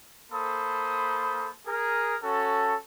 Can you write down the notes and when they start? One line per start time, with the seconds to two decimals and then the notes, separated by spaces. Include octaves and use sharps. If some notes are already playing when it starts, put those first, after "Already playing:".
0.32 A#3 A4 C5 B5 D#6
1.67 G#4 A#4
2.22 C#4 F#4 A4